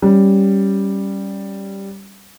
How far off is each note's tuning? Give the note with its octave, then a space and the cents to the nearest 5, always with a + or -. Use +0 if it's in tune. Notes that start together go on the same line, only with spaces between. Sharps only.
G3 +0 C#4 +0